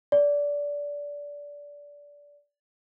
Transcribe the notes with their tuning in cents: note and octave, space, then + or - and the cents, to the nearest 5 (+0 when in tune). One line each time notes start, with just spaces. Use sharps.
D5 -20